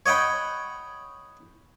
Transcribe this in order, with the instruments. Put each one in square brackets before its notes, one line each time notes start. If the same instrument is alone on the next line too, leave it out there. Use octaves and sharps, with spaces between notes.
[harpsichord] C#5 D#5 F#5 G5 B5